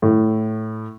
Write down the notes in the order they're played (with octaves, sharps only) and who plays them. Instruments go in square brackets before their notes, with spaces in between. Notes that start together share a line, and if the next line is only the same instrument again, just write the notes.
[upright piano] A2